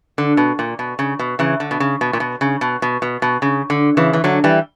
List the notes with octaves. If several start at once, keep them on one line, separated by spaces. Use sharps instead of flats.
D3
B2
A#2
B2
C#3
B2
C#3 E3
D3
B2
C#3
B2
A#2
B2
C#3
B2
B2
B2
B2
C#3
D3
C#3 E3
E3
D3 F#3
E3 G3